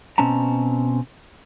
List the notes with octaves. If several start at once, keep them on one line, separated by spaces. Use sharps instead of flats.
B2 C4 C#4 A5 A#5